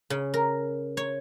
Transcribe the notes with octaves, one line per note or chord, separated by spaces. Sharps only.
C#3
A#4
C#5